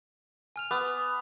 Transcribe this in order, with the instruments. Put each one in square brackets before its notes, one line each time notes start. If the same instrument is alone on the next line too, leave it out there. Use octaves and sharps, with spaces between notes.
[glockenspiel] G#5 F6 F7
[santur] B3 [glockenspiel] D6 D#6 F6